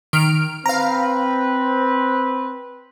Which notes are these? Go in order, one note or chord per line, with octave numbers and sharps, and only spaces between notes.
D#3 F6 D7
C4 B4 F5 A#5